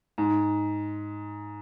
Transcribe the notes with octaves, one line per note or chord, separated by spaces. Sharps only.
G#2